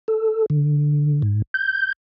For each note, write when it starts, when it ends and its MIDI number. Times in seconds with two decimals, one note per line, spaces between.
0.08 0.46 69
0.50 1.22 50
1.22 1.42 44
1.54 1.93 91